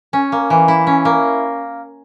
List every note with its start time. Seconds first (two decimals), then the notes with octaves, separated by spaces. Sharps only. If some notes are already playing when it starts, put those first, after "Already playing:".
0.13 C#4
0.32 A#3
0.50 E3
0.68 E4
0.87 C#4
1.05 A#3